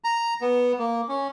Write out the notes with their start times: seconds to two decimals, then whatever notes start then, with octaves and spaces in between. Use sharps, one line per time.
0.04 A#5
0.41 B3
0.79 A#3
1.09 C#4